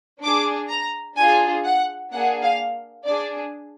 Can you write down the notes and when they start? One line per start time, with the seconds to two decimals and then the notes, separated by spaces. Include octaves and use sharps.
0.22 D4 G#4 D6
0.69 A#5
1.17 D4 F4 G#4 G#5
1.65 F#5
2.12 A#3 D4 G#4 F#5
2.43 F5
3.06 D4 G#4 D5